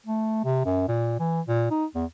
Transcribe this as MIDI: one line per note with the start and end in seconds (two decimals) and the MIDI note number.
0.06 0.44 57
0.44 0.65 48
0.65 0.85 42
0.88 1.17 46
1.19 1.41 52
1.48 1.67 46
1.70 1.85 63
1.95 2.05 40